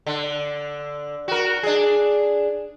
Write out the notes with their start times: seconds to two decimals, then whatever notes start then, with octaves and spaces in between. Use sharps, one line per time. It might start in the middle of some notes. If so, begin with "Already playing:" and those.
0.06 D3
1.28 F#4 A#4
1.63 D4 G#4